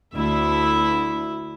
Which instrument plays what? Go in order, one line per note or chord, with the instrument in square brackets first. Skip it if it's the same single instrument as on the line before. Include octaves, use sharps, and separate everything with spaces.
[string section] D2 [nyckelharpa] E4 E5